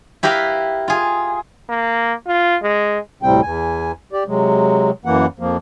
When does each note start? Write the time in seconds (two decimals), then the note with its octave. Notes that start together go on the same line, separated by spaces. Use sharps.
0.23 E4 G4 A#4 B4 F5
0.88 F4 G#4
1.69 A#3
2.27 F4
2.62 G#3
3.23 D2 A2 C3 G3 C4 G5
3.42 E2 G#5
4.13 G4 D5
4.27 C3 F#3 G#3
5.05 F#2 E3 A#3 F#5
5.39 F2 F3 A#3